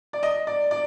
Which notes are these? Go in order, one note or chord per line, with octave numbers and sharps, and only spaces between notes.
D5
D#5
D5
D5